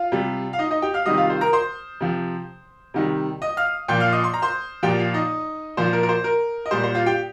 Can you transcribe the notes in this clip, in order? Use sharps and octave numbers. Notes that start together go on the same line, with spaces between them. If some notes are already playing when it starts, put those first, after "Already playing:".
Already playing: F4 F5
C3 G3
F5
D#4 D#5
D#4 D#5
G4 G5
F5 F6
C3 D#3 G3 D#5 D#6
F4 F5
C5
A#4 A#5
C5 C6
C3 F3
C3 D#3 G3
D#5 D#6
F5 F6
A#2 F3 G5 G6
F5 F6
D#5 D#6
C6
A#5
C5 C6
A#2 F3 G4 G5
F4 F5
D#4 D#5
A#2 F3 C5
A#4
A#4
C5
A#4
D#5
A#2 G3 C5
C5
F4 F5
G4 G5